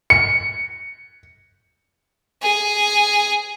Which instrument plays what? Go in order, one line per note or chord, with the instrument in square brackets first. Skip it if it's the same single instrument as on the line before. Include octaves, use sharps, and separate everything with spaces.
[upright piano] C#7
[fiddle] G#4